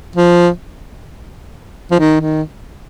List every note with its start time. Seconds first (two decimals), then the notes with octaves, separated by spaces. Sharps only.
0.16 F3
1.91 F3
1.99 D#3
2.20 D#3